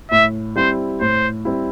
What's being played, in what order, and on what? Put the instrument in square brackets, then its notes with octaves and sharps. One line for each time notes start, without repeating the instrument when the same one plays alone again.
[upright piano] A2 [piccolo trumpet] E5
[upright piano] G3 C4 E4 [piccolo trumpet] C5
[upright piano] A2 [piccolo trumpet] C5
[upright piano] G3 C4 E4